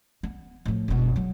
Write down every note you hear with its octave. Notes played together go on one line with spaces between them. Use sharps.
B3
A2 F3
F#1 B2
F#3